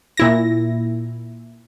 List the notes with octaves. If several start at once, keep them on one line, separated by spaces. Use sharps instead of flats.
A#2 E4 A#6